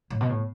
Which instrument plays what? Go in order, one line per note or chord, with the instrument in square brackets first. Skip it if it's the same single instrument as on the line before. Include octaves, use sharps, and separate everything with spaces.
[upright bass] A2
B2
A2